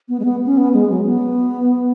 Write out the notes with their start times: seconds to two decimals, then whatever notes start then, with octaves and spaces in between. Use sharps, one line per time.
0.09 B3
0.19 G#3
0.25 B3
0.46 C#4
0.57 B3
0.73 G#3
0.90 F#3
1.06 B3